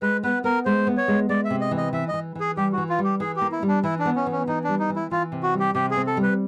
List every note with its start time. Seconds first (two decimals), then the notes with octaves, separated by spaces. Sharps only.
0.02 G#3 B4
0.23 B3 B4
0.44 B3 A#4
0.65 G#3 C5
0.87 B3
0.97 C#5
1.08 G#3
1.29 G#3 D5
1.45 E5
1.50 C3
1.61 D#5
1.71 E3
1.77 D#5
1.93 E3 E5
2.08 D#5
2.14 E3
2.35 E3 G#4
2.57 G3 G4
2.72 F#4
2.78 E3
2.89 F4
2.99 G3
3.04 G4
3.20 E3 G#4
3.36 G4
3.41 A#3
3.52 E4
3.63 G3
3.68 D4
3.83 E3 E4
3.99 D4
4.05 B3
4.16 C#4
4.27 E3
4.32 C#4
4.47 E3 D#4
4.64 G3 D4
4.79 D#4
4.90 E3
4.96 E4
5.11 E3 F4
5.32 C3
5.43 F#4
5.53 G3
5.60 G4
5.75 C3 G4
5.91 G#4
5.96 C4
6.07 A4
6.17 G3
6.23 B4